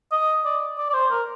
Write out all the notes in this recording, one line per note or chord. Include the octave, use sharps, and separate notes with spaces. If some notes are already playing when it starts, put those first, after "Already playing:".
D#5
D5
D5
D5
C5
A#4